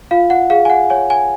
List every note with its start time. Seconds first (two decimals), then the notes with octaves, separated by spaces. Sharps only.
0.11 F4 F5
0.30 F#5
0.50 G#4 F5
0.65 G#5
0.70 F#5
0.90 C#5 G#5
1.10 G#5